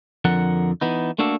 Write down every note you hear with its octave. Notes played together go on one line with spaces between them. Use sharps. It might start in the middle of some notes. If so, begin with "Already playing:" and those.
F2 D3 F3 A#4 F#5
E3 B3 D#4
A3 A#3 D4 F#4 A4